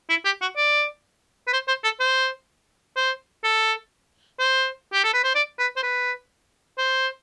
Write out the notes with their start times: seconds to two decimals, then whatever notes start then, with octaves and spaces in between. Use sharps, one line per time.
0.10 E4
0.25 G4
0.42 F#4
0.57 D5
1.48 B4
1.53 C5
1.68 C5
1.84 A4
2.00 C5
2.96 C5
3.44 A4
4.39 C5
4.93 G4
5.04 A4
5.14 B4
5.24 C5
5.35 D5
5.59 B4
5.77 C5
5.83 B4
6.79 C5